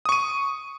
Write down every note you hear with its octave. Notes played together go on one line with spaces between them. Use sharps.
C#6 D#6 D#7